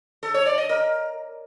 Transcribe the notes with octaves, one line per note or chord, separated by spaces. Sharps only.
A4
C#5
D5
D#5
A#4